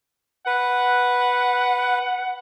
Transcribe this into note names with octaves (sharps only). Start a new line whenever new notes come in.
B4 F#5